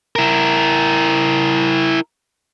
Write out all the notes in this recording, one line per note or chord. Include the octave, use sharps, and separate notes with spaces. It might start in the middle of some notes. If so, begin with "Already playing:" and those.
E4 A#4